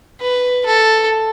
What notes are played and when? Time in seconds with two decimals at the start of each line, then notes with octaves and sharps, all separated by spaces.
0.21 B4
0.66 A4